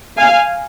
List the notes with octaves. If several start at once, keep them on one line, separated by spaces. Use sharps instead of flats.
F5 G#5